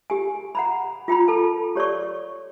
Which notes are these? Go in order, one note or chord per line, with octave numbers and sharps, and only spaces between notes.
G4 G#5
F#5 A#5 B5
F4 G5 A#5 B5
A4 A5
G4 C#5 D5 C#6